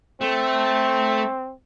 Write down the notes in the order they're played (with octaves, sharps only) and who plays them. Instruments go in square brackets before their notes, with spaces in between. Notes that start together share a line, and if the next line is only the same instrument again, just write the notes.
[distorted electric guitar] A3 [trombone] C4